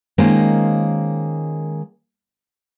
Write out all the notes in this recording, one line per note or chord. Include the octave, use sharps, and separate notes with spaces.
D#3 G#3 A#3 C#4 F4 C5